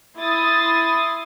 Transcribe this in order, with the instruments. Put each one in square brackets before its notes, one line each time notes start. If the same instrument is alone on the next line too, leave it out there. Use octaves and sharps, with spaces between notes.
[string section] E4 C6 D#6 A6